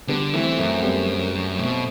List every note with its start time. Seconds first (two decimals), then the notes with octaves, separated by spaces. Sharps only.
0.08 D3 G3 B3
0.33 E3 A3 C4
0.58 F#2 A3 C4
0.76 C4
0.83 G3 B3
1.58 B2 A3 C4